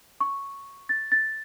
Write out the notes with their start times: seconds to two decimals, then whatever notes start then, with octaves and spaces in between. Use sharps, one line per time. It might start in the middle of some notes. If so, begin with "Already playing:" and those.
0.20 C#6
0.89 A6
1.12 A6